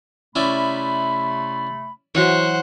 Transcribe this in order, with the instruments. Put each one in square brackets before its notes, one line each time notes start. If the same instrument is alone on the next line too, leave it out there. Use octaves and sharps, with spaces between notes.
[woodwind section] C3 A3 B5 [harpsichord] C#4 E4 D5
[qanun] E3 F#3 [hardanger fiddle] C5 F#5 [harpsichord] C#5